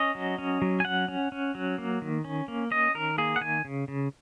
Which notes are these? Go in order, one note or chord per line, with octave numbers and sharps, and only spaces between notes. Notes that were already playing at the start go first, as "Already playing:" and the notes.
Already playing: C#4 D#5
F#3
C#4
F#3
G#5
C#4 F#5
C#4
C#4
F#3
A#3
D#3
C#4
A#3
C#4 D#5
D#3 A#4
A#3 G#4
F#5
D#3 G#5
C#3
C#3